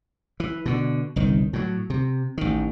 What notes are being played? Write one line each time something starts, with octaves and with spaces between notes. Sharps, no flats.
E3
B2 D3
G1 C2 D#3
A2 F#3
C3
A1 D#3